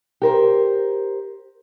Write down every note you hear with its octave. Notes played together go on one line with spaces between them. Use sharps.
G4 A#4 C5